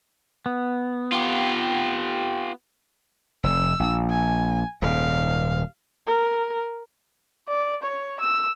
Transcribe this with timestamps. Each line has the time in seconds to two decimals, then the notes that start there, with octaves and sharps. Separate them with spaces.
0.46 B3
1.12 F4 G4
3.43 F1 E6
3.80 A#1
4.10 G#5
4.82 D#1 G#2 F5
6.07 A#4
7.48 D5
7.82 C#5
8.20 E6